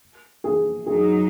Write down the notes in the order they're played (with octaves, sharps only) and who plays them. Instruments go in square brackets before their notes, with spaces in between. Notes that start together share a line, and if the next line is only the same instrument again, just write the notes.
[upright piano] G#4
[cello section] F#2 F#3 D#4 [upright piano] G#4